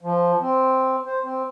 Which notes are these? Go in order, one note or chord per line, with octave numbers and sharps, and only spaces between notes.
F3
C4
C5
C4